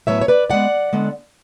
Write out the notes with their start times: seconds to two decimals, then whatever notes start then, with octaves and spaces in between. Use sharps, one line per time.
0.07 A2 F#3 B3 C#5 E5
0.21 C#5
0.28 B4 D5
0.49 A2 G#3 B3 D5 F#5
0.93 D3 G#3 B3